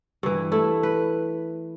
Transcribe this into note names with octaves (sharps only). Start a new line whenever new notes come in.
G2 E3
A3 E4
B4